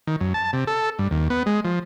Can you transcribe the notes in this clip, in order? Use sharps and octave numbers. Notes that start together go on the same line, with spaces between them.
D#3
F#2
A5
C3
A4
G2
D#2
B3
G#3
F3